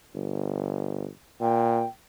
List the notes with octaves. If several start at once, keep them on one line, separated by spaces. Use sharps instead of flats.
G1
A#2 G5